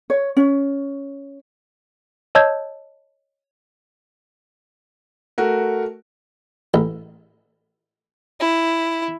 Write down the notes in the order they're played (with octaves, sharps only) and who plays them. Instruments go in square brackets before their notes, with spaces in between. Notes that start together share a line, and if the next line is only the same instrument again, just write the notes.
[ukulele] C#5
C#4
[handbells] C#5 D#5 A5 E6 G6 G#6
[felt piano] A3 F#4 A#4
[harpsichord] A1
[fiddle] E4